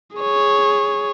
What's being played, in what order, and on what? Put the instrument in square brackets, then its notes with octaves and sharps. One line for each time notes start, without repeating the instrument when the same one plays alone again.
[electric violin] G#4 C#5